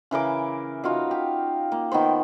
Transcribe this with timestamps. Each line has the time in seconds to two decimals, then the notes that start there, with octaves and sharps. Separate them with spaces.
0.11 C#3 E3 A#4 D6
0.84 D#4 F4 F#4 F5
1.11 G4
1.72 A#3
1.91 D#3 B3 G4 C5